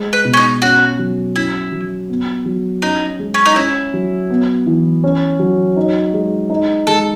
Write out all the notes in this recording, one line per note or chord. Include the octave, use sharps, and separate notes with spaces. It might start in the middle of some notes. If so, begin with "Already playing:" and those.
Already playing: G#3
B4
B2
C#4
D#4
C#4 F#4
F#3
C#4 E4
F#3
B3
F#3
C#4 D#4
G#3
C#4
D#4
C#4 E4
F#3
B3
E3
C#4
F#3
D#4
G#3
D#4
G#3 A4